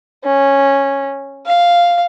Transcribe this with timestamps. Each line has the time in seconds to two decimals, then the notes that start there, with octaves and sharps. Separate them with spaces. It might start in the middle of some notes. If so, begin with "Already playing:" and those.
0.24 C#4
1.46 F5